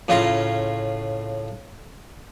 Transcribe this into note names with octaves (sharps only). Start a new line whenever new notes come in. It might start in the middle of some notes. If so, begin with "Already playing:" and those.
A2 C#3 F4 F5 A#5